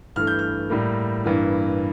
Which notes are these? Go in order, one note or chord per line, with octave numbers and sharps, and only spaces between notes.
G2 E3 A3 F6
G6
F6
A2 G3 A#3
G2 E3 A#3